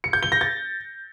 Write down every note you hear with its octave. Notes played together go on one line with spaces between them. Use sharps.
C#7
G6
G7
A#6
A6